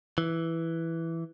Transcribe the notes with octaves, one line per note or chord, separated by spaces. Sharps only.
E3